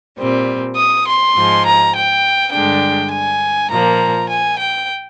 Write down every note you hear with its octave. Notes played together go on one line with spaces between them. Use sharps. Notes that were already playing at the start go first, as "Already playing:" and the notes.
A#2 G3 C4
D#6
C6
G#2 F3 G#3
A#5
G5
G2 D3 G#3 D4 G5
G#5
A#2 F3 A#3 A#5
G#5
G5